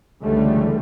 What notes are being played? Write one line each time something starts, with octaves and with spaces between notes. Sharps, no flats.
C#2 D3 E3 G3 A3